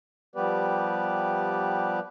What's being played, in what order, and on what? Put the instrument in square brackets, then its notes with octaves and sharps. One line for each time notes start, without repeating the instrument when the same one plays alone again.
[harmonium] F3 G3 B3 G4 B4 D5